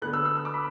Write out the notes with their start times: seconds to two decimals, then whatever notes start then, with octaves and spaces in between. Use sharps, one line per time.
0.02 D2 D3 B3 F#6
0.13 E6
0.25 E6
0.37 E6
0.45 D6
0.54 B5